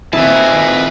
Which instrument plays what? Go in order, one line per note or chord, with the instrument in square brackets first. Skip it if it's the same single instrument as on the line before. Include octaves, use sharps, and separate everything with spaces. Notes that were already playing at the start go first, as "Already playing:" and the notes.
[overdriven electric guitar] F2 G#4 [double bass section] D#3 A#3 C4 [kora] E4 [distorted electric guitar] B4 A5